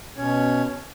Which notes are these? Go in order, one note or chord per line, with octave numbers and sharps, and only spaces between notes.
B2 C#4 C#5